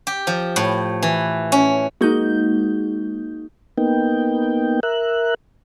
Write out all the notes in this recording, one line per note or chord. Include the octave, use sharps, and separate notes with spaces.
G4
F3
A2
E3
C#4
G#3 A#3 D#4 F#4 G6
A#3 B3 D#4 G5
A#4 E5 F#6